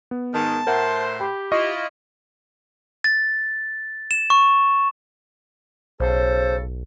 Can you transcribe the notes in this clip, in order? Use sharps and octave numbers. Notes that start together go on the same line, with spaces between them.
B3
G#2 D#3 A5
A2 A#4 C5 E5 F#5
G4 G5 B5
E4 F4 D#5 C#6
A6
E7
C#6
B1 C#3 A4 C5